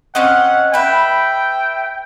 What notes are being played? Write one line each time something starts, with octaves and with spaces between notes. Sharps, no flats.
C4 C#4 D#5 F#5
B4 E5 G5